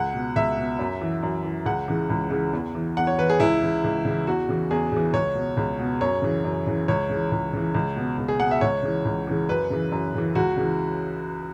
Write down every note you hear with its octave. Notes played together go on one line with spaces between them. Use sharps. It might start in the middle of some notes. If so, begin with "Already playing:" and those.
Already playing: C#2 F#5
B2
C#2 E5
B2
F#2
E3
F#2
E3
C#2 F#5
C#3 E3
C#2
C#3 E3
E2
E3
E2 F#5
C#5
E3 B4
G#4
C#2 E4
C#3 E3
C#2
C#3
E3
E2 F#4
C#3 E3
E2 G#4
C#3 E3
C#2 C#5
B2
C#2
B2
F#2 C#5
C#3 E3
F#2
C#3 E3
C#2 C#5
C#3 E3
C#2
C#3 E3
C#2
B2
C#2
G#4
B2 F#5
E5
C#2 C#5
C#3 E3
C#2
C#3 E3
F#2 B4
C#3 E3
F#2
C#3 E3
C#2 F#4
C#3 E3